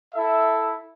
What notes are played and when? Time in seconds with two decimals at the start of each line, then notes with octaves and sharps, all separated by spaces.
0.14 E4 A4 E5